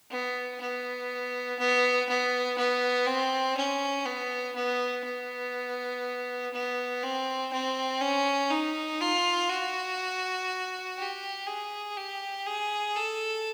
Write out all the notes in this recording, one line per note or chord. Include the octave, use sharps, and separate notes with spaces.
B3
B3
B3
B3
B3
C4
C#4
B3
B3
B3
B3
C4
C4
C#4
D#4
F4
F#4
G4
G#4
G4
G#4
A4